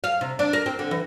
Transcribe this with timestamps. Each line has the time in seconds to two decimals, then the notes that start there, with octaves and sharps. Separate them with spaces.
0.04 F5
0.21 C3
0.39 D4
0.53 A#4
0.66 C4
0.79 D3
0.91 E3